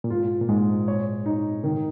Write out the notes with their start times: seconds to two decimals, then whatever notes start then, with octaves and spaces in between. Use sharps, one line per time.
0.04 A#2
0.10 G#2 F4
0.41 A#2
0.48 G#2 G#3
0.88 C#5
1.26 D#4
1.64 D#3